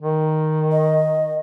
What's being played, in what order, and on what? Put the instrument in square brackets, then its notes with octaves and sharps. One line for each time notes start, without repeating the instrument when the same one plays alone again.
[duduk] D#3
[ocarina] D#5